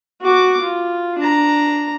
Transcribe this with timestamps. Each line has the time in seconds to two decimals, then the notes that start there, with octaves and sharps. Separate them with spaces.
0.22 F#4 D6
0.61 F4
1.19 D4 A#5